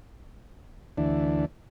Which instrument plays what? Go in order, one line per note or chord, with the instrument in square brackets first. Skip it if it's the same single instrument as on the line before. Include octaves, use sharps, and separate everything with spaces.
[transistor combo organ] D2 E3 D4